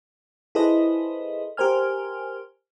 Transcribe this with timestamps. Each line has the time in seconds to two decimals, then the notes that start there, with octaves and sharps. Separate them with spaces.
0.55 E4 G#4 A4 B4 C5 D#5
1.57 G4 A#4 C5 G#5 F6